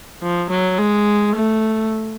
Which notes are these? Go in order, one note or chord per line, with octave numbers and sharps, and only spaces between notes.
F3
F#3
G#3
A3